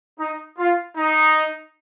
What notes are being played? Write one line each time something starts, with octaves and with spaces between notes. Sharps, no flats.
D#4
F4
D#4